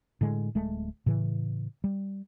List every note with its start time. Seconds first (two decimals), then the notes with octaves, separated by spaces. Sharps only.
0.21 A2 D3 G#3
0.55 D1 G#3 A3
1.06 A2 C#3 E3
1.84 G3